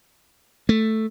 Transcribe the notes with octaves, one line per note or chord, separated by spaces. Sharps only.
A3